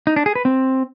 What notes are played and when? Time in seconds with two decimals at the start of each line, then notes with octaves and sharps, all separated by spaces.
0.07 D#4
0.16 D4
0.26 G#4
0.35 B4
0.45 C4